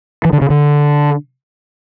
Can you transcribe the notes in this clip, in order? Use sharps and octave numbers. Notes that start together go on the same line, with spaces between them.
E3
D3
C#3
D3